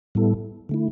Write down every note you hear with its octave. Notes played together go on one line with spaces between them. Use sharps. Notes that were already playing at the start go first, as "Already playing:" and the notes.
A2 G3 B3 E4 A4
D3 A3 E4